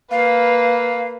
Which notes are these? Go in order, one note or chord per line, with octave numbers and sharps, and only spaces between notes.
A#3 B4 F5